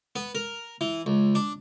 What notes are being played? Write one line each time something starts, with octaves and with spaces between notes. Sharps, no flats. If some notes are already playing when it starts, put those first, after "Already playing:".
B3
A#4
E3
C#2
D4